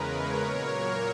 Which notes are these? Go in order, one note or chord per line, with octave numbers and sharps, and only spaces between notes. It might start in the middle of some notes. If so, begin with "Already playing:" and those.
Already playing: E2 C#3 G#3 A#4 B4
A#4 C#5
A#2 F#3 A#3